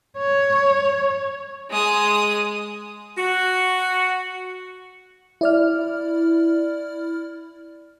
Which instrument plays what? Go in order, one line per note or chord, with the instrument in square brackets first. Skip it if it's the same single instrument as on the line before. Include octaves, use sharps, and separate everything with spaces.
[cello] C#5
[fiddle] G#3 D#6
[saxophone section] F#4
[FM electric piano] E4 D5 F6